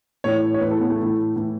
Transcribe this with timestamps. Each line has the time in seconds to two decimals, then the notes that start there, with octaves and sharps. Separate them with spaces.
0.24 A2 E3 C#5
0.54 C#5
0.61 A2 E3 B4
0.71 A4
0.79 B3
0.90 A3
0.98 A2 E3
1.36 A2 E3